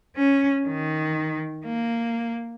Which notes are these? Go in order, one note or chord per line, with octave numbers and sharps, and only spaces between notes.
C#4
D#3
A#3